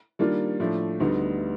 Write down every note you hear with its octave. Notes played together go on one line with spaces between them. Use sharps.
D#3 G3 A#3 D4 F4
A2 F3 A3 D4
D2 D3 G3 B3 D#4